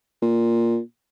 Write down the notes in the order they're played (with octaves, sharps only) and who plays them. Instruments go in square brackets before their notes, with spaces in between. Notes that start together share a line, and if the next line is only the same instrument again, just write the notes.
[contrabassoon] A#2